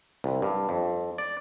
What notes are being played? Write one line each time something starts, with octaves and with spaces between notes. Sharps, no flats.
C2
G2
F2
D5